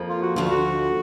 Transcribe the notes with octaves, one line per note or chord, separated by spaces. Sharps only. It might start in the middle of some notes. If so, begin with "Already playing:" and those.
Already playing: F2 F3 A#3
F4
F#4
D2 D3 F3 F4
F#4